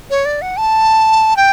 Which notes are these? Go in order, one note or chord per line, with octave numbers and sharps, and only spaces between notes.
C#5
D5
F#5
A5
G5